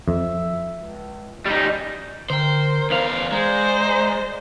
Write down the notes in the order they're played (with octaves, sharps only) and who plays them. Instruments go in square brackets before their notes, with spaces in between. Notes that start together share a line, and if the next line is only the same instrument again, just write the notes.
[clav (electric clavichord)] F2 [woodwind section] E5
[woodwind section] C#2
[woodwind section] A#2 C#5 D#5 [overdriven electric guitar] G3 D#4
[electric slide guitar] D3 G5 [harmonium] A#4 [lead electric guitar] C5
[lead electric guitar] E2 C5 [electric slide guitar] B4 F5
[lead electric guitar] G#3 [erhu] C5 [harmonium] D5 A#5